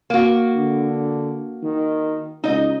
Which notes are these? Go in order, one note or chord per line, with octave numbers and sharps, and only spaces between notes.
A#3 F#4
D3
D#3
C#2 D#4 D#5